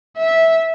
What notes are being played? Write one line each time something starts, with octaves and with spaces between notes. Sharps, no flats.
E5